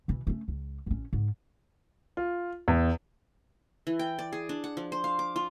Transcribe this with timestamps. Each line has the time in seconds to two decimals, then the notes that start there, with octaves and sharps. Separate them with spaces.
0.08 B2 E3
0.27 A3 C#4
0.48 C#2
0.86 A1 C#4
1.13 G#2
2.17 F4
2.68 E2
3.87 E3
3.99 G5
4.19 D5
4.33 G#4
4.49 D4
4.64 F#5
4.77 F3
4.92 C5
5.04 F5
5.19 D6
5.36 F4